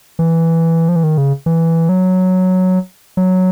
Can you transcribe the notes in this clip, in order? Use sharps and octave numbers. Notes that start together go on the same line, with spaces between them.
E3
F3
E3
D#3
C#3
E3
F#3
F#3